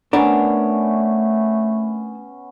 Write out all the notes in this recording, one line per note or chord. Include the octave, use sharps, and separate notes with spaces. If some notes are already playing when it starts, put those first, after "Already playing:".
A3 B3 C#4 D4 A#4